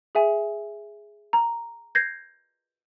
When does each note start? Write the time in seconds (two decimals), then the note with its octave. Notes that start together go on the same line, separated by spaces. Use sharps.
0.15 G#4 E5 G#5
1.33 A#5
1.95 G6 G#6 A#6 C7